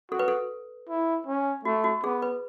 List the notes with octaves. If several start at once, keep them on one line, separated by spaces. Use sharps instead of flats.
F#4 A4
B4
A4
E4
C#4
A3 F#4
F#4
B3 G#4
B4